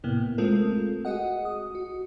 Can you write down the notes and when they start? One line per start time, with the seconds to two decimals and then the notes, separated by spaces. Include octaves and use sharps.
0.04 A2 C3 A#3 B3 E4
0.38 G#3 A3 C4 F4 A4 A#4
1.05 F#4 G#4 D#5 F#5
1.45 D#6
1.75 F#4